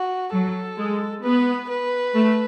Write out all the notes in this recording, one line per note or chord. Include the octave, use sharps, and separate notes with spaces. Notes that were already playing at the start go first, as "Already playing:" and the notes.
Already playing: F#4
F#3 A4
G#3
B3 B4
B4
A3